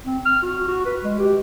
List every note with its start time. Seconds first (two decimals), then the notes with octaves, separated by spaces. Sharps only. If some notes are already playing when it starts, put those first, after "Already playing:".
0.05 C4
0.25 F6
0.42 F#4
0.68 F#4
0.85 B4
1.03 G#3
1.18 G4